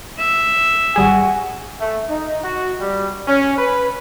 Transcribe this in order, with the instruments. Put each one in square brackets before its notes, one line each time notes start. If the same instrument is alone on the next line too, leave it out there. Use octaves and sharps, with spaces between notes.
[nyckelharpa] E5
[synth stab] G#1 G3 G#4 [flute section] F#4 G#5
[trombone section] A3
D#4
F#4
G3
C#4
B4